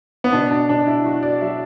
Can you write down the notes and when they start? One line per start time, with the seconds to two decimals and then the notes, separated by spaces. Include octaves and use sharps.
0.24 B3
0.33 B2 D4
0.51 D4
0.69 B2 D4
0.87 E4
1.05 F#3 F#4
1.23 D5
1.41 F#3 E5